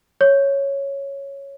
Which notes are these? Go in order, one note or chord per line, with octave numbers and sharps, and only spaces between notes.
C#5